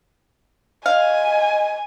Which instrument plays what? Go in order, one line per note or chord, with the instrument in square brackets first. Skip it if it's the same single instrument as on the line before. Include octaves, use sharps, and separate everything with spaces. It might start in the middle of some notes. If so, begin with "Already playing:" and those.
[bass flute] D#5 [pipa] F5 [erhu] G#5